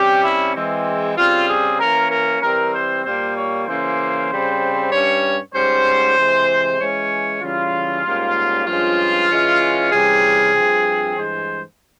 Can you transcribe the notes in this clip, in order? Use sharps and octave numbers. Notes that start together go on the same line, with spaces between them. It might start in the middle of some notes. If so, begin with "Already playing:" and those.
Already playing: C3 G3 C#4 G4
E4
E3 G#3 C4
C#3 G3 C4 F4
G#4
E3 A#3 C#4 A#4
A#4
E3 G3 C4 A#4
C5
A#2 G3 A#3 C5
C#5
C#3 E3 A#3 C#4 C5
C#3 G3 C4
G2 G3 C#4 C#5
G#2 G3 C#4 C5
C3 E3 G#3
E3 G#3 C#4 C#5
C#3 E3 G3 C#4 F4
G#2 G3 A#3 C#4
G2 F3 G#3 C#4 F4
E3 G#3 C#4
C3 E3 G3 C#4 G#4
G2 F3 C4
G2 E3 G#3 C5